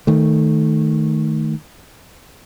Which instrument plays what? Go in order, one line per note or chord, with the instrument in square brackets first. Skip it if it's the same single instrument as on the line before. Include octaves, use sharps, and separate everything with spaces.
[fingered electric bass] D#3 A3